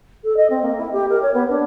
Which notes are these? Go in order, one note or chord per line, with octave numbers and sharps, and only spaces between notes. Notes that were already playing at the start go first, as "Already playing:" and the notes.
A4
D#5
C4
A#3
E4
G4
A#4
C#5
B3
D4